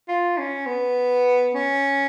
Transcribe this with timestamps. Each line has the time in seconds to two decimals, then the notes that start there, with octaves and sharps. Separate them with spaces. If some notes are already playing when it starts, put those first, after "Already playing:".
0.08 F4
0.38 C#4
0.66 B3
1.55 C#4